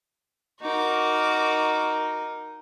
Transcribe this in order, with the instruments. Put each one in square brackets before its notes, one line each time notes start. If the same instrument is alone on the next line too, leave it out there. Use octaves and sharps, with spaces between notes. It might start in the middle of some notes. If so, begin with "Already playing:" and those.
[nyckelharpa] D#4 A#4 [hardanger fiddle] F#4 D6